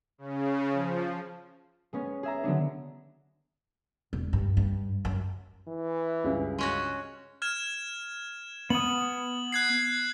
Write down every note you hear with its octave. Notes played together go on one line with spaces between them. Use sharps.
C#3
F3
G#3 B3 C#4
G#4 E5 A#5
D3 F#3 B3 D4
E1
G2
G2
F#2
E3
C#2 G2 C#3
G#3 C#4 F#4
F6 G#6 E7
B3 D#6 F#7
F#6 G#6 C7